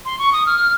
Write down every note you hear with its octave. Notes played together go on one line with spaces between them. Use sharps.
C6
C#6
D#6
F6